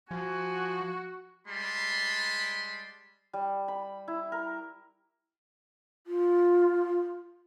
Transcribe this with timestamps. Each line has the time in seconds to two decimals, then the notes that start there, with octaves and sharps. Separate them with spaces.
0.11 F3 F#4 G#5
1.48 G3 G#3 A5 B5 C6
3.33 G3
3.68 B5
4.08 E4
4.32 A#4
6.07 F4